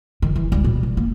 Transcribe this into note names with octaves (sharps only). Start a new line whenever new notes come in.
D#3
E3
C#2 G3
B2
F3
A#3